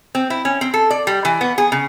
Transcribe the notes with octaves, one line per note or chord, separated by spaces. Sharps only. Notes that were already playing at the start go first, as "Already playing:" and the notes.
C4
E4
C#4
C4
A4
D5
G3
E3
B3
G#4
C#3